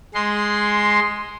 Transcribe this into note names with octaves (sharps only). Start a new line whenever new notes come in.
G#3 C6